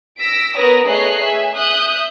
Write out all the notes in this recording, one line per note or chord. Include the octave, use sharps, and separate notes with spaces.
E6 A#6 B6 D7
B3 A#4 B4 C#5 D#6 A#6
A3 G#4 C#5 D#5 F#6 C7
E5 G#5
E5 D#6 F#6 G6